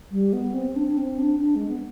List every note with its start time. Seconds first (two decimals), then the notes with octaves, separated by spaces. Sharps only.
0.11 G3
0.33 B3
0.54 C4
0.76 D4
0.87 D4
0.97 C4
1.19 D4
1.40 D4
1.56 G#3
1.67 B3